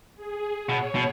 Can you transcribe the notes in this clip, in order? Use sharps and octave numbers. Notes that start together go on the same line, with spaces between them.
G#4
B2 C#5
B2